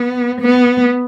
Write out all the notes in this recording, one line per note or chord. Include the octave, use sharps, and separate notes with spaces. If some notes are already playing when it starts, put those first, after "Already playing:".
Already playing: B3
B3